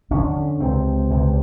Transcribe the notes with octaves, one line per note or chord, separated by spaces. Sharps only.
F2 D3 C#4
C#2 C3 C4
C#2 C3